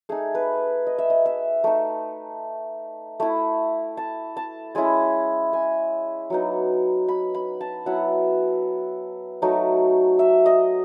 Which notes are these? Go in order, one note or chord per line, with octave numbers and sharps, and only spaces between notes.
A3 D#4 G#4
B4
D#5
E5
D#5
E5
A3 D#4
A3 E4
A5
A5
G#3 C#4 E4 G#5
G#5
F#3 B3 D#4
B5
B5
A5
F#3 B3 E4 F#5
F#3 A3 D#4
E5
D#5